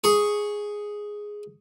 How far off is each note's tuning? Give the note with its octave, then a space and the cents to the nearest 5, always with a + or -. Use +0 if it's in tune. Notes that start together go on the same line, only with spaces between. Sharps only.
G#4 +0 C#6 +0